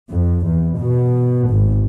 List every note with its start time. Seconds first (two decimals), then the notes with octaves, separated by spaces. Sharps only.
0.11 F2
0.46 E2
0.78 B2
1.50 G#1